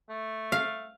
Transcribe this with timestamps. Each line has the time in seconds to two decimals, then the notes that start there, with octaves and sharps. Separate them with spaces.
0.09 A3
0.52 F5